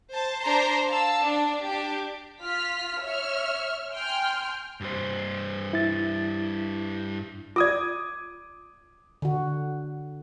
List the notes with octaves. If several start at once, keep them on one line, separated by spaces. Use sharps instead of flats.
C5 A5
D4 C5 A#5 C6
F5 A5 E6
D4
D4 G4
F4 F6 B6
C#5 E5 F6
G5 G#5 C6 F6
G2 C5
E4 A6
F4 D5 D6 D#6 G#6
D3 F#4